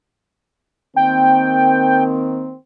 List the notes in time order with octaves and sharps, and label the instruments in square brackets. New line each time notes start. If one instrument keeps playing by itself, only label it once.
[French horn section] D#3 A#3 C4 [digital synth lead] G5